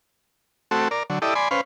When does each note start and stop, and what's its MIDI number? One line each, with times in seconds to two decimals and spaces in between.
0.71 0.88 57
0.71 0.88 60
0.71 0.88 66
0.71 0.88 69
0.91 1.03 70
0.91 1.03 74
1.10 1.19 50
1.10 1.19 54
1.22 1.34 64
1.22 1.34 67
1.22 1.34 69
1.22 1.34 74
1.22 1.34 75
1.35 1.48 74
1.35 1.48 80
1.35 1.48 83
1.35 1.48 84
1.51 1.61 61
1.51 1.61 71
1.51 1.61 72
1.51 1.61 77